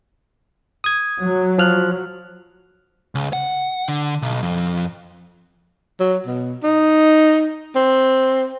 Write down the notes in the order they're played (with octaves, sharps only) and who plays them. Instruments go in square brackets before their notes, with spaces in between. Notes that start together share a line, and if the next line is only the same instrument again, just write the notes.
[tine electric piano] D#6 G#6
[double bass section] F#3
[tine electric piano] F3 F6 F#6
[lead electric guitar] C#2
F#5
D3
B1
F2
[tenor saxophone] F#3
B2
D#4
C4